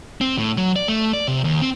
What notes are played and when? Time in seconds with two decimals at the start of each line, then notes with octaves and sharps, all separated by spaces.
0.21 C4
0.38 A2
0.57 F#3
0.76 D5
0.88 A3
1.13 D5
1.28 C3
1.44 D#2
1.62 C4